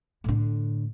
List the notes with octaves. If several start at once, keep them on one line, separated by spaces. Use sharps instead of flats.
A2 D3